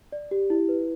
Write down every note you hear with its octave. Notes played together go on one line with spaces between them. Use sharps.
D5
G4
E4
B4